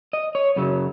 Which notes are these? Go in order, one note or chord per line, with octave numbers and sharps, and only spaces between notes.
D#5
C#5
F#2 C#3 F#3